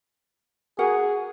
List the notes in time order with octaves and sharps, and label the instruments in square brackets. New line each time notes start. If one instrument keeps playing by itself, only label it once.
[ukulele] F#4 A#4 F#5 [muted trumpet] G#4